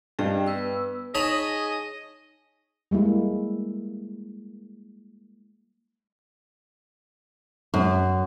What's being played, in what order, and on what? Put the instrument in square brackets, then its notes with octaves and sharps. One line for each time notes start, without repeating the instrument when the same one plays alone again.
[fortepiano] G2 [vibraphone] G4 D#5 G5
[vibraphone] B3 B4 E6
[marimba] D#4 [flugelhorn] G#4 [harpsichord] C#5 A5 B5 [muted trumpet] D#5
[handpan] G3 G#3 A#3 E4
[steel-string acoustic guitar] F#2